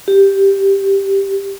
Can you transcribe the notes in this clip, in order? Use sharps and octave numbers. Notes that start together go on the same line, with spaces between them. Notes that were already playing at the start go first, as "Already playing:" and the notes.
G4